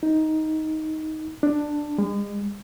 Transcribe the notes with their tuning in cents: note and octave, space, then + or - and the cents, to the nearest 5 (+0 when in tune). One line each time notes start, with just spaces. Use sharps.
D#4 +10
D4 +10
G#3 -35